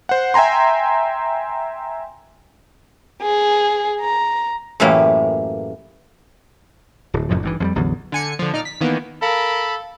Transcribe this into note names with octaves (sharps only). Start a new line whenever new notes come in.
C5 F#5
E5 G5 G#5 A#5 C6
G#4
A#5
F#2 A2 E3 A3 A#3 G4
D1
F1 F#2 A2 F3
G#1 G2 E3
F2 E3 G3
A1 E2 D3 F#3
D3 G#5 C#7
D3 F3
A#2 D#4 D5 F6
B6
D#3 E3 A#3 B3
A4 A#4 F5 B5